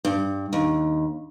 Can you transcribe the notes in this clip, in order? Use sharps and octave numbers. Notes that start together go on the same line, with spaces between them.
G2
D#2